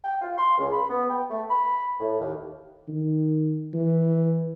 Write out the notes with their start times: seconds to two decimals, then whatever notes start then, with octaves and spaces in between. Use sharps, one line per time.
0.04 G5
0.22 F4
0.38 C6
0.58 C#2
0.72 B5
0.90 B3
1.10 G5
1.30 A3
1.50 B5
2.00 A2
2.20 D#2
2.88 D#3
3.74 E3